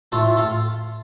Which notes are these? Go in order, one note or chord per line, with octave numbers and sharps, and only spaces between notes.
A2 F4 A4
F4 A4